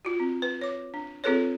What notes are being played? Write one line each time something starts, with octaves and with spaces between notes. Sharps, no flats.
F4 F#4
C4
B4
C#5 D6
D4
C4 F4 G#4 A4 B4 C#5